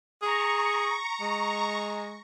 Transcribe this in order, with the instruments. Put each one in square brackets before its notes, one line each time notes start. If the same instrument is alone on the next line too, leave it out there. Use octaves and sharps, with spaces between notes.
[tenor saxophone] G#4 [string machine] A#5 C#6
[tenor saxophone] G#3